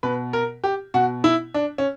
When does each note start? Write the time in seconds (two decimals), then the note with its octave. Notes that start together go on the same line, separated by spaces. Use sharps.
0.03 B2 B4
0.33 A#4
0.64 G4
0.94 B2 F#4
1.24 E4
1.54 D4
1.78 C#4